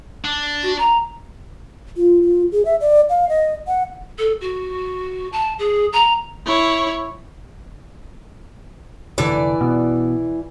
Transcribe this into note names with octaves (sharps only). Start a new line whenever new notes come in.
D4
F#4
A#5
F4
F4
G#4
E5
D5
F5
D#5
F#5
A4
F#4
A5
G#4
A#5
E4 C#5
F1 D3 E3 D5
B2